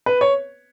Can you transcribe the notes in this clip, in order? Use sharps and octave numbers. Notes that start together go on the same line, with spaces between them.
B4
C#5